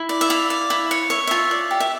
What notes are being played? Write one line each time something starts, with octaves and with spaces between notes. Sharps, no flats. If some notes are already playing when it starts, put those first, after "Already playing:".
Already playing: E4
D5
E5
E4 F5
D5
E4
C#5
C#5 E5
F4 E5
D5
G4
E5